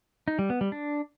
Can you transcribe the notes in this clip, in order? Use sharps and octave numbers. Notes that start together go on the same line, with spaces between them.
D#4
G3
B3
G3
D4